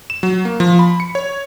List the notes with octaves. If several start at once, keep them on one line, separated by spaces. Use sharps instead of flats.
E7
F#3
A#3
F3
B5
C#7
C#5